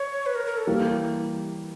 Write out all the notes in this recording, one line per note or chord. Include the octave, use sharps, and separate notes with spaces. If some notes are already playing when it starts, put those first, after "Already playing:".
Already playing: C#5
B4
A#4
A#4
A4
E3 G3 A#3